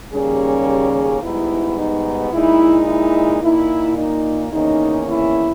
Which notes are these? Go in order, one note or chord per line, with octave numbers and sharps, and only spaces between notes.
D#2 C#3 G3 A#3 C#4 G#4
G#4
G#2 G3 B3 D#4 E4
D#4
A#2 G#3 D#4 E4
E4
A#2 A#3 D#4 E4
D#4
E2 D#3 A#3 C#4 D#4
E4